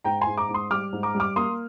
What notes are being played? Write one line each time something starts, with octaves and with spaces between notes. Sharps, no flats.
G#2 G5 A#5
G#5 C6
G#2
A#5 D6
G#2
C6 D#6
G3 D6 F6
G#2
A#5 D6
G3
D6 F6
A#3 C6 D#6